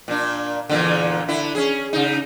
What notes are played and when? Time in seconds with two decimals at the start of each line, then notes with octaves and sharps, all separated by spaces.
0.08 A#2 D4
0.69 E2 A#2 D3
1.28 D3 E4
1.55 C#4 G#4
1.93 C#3 D#4